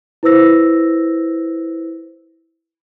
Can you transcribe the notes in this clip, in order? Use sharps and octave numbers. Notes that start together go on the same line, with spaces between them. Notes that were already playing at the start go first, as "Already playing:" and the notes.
E4 B4 C5 E6 A#6